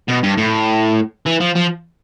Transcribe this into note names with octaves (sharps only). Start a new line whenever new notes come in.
B2
G2
A2
E3
F3
F3